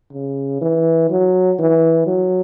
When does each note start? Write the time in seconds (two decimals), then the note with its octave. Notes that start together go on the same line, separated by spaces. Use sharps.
0.13 C#3
0.61 E3
1.10 F#3
1.59 E3
2.06 F#3